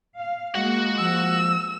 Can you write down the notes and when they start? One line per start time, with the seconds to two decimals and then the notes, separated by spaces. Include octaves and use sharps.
0.18 F5
0.55 G#3 A#3 F#4 F#5
0.99 F3 E6